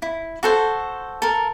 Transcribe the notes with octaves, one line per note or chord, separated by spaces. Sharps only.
E4
F#4 A4 C5
A4 A#4